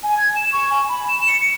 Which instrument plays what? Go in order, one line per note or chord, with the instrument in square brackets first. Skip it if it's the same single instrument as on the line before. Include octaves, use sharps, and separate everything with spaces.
[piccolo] G#5
G#6
E7
C#6
G#5
B5
E7
C#7
C#7